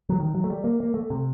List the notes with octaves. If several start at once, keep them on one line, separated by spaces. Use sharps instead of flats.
F#3
D#3
F#3
A3
G3
A#3
A#3
A3
C3